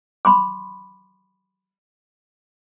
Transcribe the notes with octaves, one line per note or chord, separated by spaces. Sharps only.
B5 C6 D6